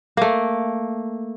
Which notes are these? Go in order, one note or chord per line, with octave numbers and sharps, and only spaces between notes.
A3 A#3